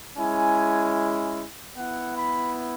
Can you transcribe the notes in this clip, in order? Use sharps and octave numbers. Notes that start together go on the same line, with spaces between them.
G#3 C#4 E4 G#5
B3 E4 F#5
B5